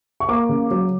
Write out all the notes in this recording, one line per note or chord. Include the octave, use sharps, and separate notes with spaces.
C#6
A#3 D6
C#3
F#3